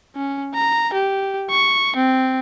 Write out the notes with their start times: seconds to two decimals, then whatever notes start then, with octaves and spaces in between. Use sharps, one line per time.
0.16 C#4
0.55 A#5
0.93 G4
1.50 C#6
1.96 C4